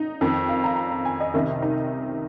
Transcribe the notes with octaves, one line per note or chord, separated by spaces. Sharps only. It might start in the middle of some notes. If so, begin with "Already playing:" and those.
Already playing: D#4
F2 D#3
F5
A#5
G#5
D#5
C2 C3 D#3
D#4